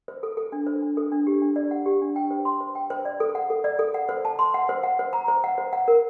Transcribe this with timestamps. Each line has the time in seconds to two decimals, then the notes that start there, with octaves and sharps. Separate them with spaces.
0.08 C5
0.23 A4
0.37 A4
0.52 D4
0.67 C5
0.82 D4
0.97 A4
1.12 D4
1.27 G4
1.42 D4
1.56 D5
1.71 F#5
1.86 G4
2.01 D4
2.16 G5
2.31 C5
2.45 C6
2.61 C5
2.75 G5
2.90 C5
3.05 D5
3.20 A4
3.35 F#5
3.50 A4
3.64 D5
3.79 A4
3.94 F#5
4.09 C5
4.25 A5
4.39 C6
4.54 F#5
4.69 C5
4.83 F#5
4.99 C5
5.13 A#5
5.28 C5
5.44 F#5
5.58 C5
5.73 F#5
5.88 A#4